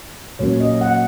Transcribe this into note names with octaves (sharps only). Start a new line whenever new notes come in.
A#2 F#3 A#3 C#4 C#5
D#5
F#5